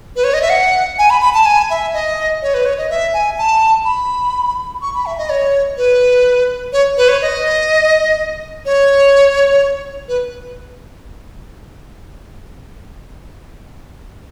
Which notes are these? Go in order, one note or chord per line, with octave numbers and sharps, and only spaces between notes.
B4
C#5
D#5
E5
F#5
G#5
B5
B5
A5
G#5
E5
D#5
C#5
B4
C#5
D#5
E5
G#5
A5
B5
C#6
B5
E5
D#5
C#5
B4
C#5
B4
C#5
D#5
C#5
B4